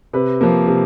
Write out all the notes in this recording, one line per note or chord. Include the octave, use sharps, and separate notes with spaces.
C3 B4
F3 A#3
C3